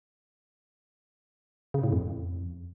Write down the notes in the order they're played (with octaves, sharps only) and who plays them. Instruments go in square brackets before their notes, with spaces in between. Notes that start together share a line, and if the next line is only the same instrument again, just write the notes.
[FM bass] C#3
A2
F2